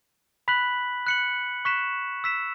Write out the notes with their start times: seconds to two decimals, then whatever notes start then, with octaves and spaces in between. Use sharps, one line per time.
0.48 B5 F#6 B6 F#7
1.07 F#6 C#7 F#7
1.65 C#6 F#6 B6 E7
2.24 E6 B6 E7